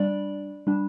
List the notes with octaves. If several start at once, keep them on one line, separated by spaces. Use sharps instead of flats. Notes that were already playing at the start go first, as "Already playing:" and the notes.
Already playing: G3 D4 D5
G3 D4